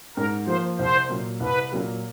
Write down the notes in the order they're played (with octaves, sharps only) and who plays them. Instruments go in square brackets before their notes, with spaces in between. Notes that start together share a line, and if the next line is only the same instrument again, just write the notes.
[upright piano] G#2 [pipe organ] A#4
[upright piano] F3 A#3 [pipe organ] C5
[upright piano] C2 [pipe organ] C5
[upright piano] A#2 F#3 A#3
[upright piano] C2 [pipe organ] B4
[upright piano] A#2 F#3 A#3